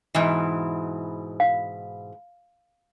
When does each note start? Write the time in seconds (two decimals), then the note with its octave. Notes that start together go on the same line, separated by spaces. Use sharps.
0.14 G#2 B2 E3
1.40 F5